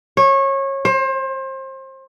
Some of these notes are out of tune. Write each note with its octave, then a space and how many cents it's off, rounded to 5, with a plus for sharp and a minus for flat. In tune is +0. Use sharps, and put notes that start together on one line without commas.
C#5 -25
C5 +30